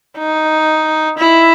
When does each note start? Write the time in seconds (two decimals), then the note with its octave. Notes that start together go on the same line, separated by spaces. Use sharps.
0.18 D#4
1.18 E4